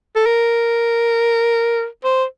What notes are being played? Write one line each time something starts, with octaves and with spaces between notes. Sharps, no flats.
A4
A#4
C5